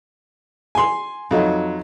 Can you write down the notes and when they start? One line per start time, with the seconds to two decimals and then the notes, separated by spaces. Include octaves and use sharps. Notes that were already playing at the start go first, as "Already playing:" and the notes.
0.75 G#5 C6
1.31 F2 F#3 D#4